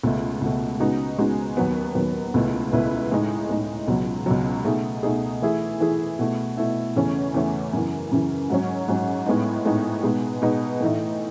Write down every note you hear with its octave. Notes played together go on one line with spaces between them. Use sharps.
C#2 B2 A3
C#2 B2 A3
C#3 G#3 B3 D#4 F#4
C#3 G#3 B3 D#4 F#4
D#2 D#3 F#3 B3
D#2 D#3 F#3 B3
C#2 B2 A3 E4 B4
C#2 B2 A3 E4 B4
A2 G#3 D#4
A2 G#3 D#4
C#2 B2 F#3
C#2 B2 F#3
B2 A3 D#4 G#4
B2 A3 D#4 G#4
E3 A3 E4 G#4
E3 A3 E4 G#4
B2 A3 E4
B2 A3 E4
E2 C#3 E3 A3 C#4
E2 C#3 E3 A3 C#4
F#2 C#3 E3
F#2 C#3 E3
G#2 F#3 C#4
G#2 F#3 C#4
A2 G#3 B3 D#4
A2 G#3 B3 D#4
B2 G#3 D#4 G#4 B4
B2 G#3 D#4 G#4 B4
A2 E3 A3 D#4